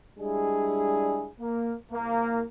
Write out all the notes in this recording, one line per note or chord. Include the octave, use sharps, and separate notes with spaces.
G3 G#3 D4 E4 G#4
A#3
C2 A#3